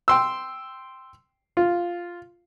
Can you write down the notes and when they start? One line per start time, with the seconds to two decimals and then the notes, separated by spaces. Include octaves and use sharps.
0.08 G5 C6 E6
1.57 F4